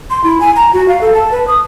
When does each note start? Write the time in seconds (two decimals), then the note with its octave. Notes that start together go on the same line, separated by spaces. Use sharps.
0.10 C6
0.24 E4
0.40 G#5
0.56 A#5
0.73 F#4
0.88 F5
1.01 A4
1.14 A5
1.32 B4
1.48 D#6